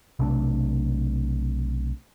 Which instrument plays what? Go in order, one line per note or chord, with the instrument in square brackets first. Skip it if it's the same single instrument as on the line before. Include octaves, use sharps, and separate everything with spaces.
[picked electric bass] B1 C3 A3 D4